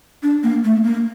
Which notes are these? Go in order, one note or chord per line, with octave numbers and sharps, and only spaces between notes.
D4
A#3
A3
A#3